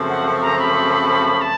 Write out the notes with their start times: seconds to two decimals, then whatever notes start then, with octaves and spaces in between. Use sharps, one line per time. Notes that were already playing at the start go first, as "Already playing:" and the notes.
Already playing: F#2 C#3 F3 A3 C4
0.09 F#5
0.42 A#5
0.59 B5
1.41 A5